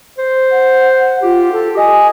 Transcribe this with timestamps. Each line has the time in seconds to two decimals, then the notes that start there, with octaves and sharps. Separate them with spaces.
0.19 C5
0.52 F#5
1.22 F4 G4
1.53 A4
1.77 D#5 G#5